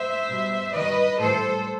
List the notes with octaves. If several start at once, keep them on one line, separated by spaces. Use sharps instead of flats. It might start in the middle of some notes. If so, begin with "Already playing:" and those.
Already playing: C5 E5
B2 G3
D#3 G3 B4 D#5
A2 E3 G3 A4 C5